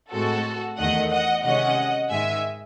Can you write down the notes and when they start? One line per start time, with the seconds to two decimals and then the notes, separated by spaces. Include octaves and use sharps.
0.11 A2 G#3 C4 F#4 A4
0.77 E2 D#3 A3 D#5 F#5
1.10 D#5 F#5
1.43 C3 D#3 G#3 C#4 D#5 F#5
2.10 G#2 D#3 G#3 E5 G#5